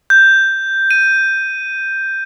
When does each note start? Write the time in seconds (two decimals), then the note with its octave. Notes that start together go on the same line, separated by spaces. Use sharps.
0.10 G6
0.91 D#7